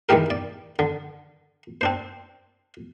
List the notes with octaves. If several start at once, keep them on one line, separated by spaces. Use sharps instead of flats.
D#3 E3 G#3 G4 A#4
D5
D3
C4 D4 C5